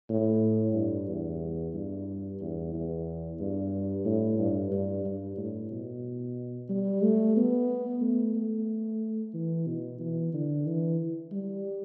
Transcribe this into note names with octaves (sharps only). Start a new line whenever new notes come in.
A2
G2
E2
G2
E2
E2
G2
A2
G2
G2
G2
A2
B2
G3
A3
B3
A3
A3
E3
B2
E3
D3
E3
G3